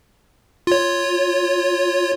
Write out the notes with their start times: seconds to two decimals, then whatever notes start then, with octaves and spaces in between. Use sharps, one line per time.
0.67 F4 C#5